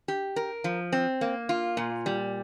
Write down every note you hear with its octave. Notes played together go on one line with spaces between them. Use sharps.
G4
A#4
F3
C4
A#3
F4
A#2
G3